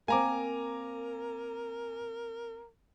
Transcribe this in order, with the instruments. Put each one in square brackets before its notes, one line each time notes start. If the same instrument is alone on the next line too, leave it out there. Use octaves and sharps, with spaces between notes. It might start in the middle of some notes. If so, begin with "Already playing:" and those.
[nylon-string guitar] A#3 C4 [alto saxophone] A#4 [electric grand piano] G#5 A#5 D6